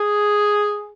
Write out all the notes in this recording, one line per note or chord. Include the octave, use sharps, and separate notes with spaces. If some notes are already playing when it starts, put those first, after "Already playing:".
Already playing: G#4